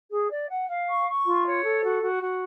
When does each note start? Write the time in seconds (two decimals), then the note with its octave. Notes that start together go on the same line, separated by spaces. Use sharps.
0.12 G#4
0.30 D5
0.50 F#5
0.69 F5
0.87 C#6
1.07 C#6
1.25 F4
1.44 C#5
1.63 A4
1.81 F#4
2.00 F#4
2.20 F#4